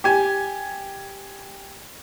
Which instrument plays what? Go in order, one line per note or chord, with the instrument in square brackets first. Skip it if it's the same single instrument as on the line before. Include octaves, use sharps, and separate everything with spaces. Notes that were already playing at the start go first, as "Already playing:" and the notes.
[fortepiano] G4 G#5